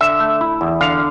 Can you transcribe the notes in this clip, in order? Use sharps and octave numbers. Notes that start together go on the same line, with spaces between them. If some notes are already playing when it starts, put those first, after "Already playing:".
D3 E5
A3
E4
E2
D3 F5